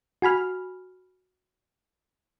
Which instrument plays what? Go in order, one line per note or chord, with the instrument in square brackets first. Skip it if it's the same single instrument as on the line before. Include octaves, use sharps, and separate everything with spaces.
[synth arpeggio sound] F#4 G#5 B5 F6